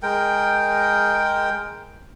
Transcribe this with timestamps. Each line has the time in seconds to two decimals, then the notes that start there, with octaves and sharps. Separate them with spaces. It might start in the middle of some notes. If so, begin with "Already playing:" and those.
0.03 G#3 A#4 G5